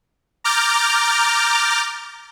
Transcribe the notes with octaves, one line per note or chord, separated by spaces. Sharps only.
A#5 D6 F6 G6 A6